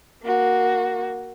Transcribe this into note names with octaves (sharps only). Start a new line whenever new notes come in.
A#3 F#4